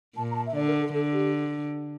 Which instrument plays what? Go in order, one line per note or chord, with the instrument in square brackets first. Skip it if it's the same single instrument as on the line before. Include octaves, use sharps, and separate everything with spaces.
[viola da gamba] A#2 [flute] A5
[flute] A#5
A5
E5
[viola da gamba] D3 [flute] D5
[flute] A#4
A4
[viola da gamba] D3 [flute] A4
[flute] G4